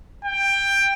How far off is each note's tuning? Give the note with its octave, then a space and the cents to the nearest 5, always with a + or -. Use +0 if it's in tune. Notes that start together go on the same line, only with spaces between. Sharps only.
G5 +15